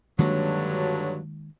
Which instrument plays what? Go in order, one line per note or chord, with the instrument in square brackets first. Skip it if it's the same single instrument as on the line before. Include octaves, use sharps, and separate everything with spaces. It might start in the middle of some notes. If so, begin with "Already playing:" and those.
[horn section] G2 D3 F#3 [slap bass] D#3 G#3 A#3